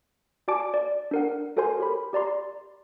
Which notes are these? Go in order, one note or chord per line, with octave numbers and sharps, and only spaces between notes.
F#4 D5 G#5 A5 D6 D7
D5
D4 A#4 F#5
F#4 A4 A#4 C5 G#5 C6
G4 A#4 C#5 B5
G4 D5 A#5 C6